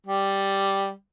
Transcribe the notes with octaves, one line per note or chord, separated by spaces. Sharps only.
G3